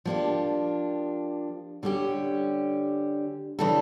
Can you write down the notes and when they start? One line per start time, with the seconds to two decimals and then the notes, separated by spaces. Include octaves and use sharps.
0.05 F3 A#3 D4 G4
1.83 D3 G3 C#4 G4
3.59 C#3 E3 G3 D4 A4